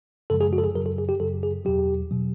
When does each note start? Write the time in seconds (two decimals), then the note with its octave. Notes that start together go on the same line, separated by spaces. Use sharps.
0.30 F#2 C#3 F3 G#3 A4
0.41 G#4
0.53 F#4
0.58 A4
0.64 G#4
0.75 F#2 C#3 F#3 A#4
0.86 A4
0.98 G#4
1.09 G4
1.20 F#2 C#3 F#3 A4
1.43 G#4
1.65 E2 B2 F#3 G4
2.11 B2 F#3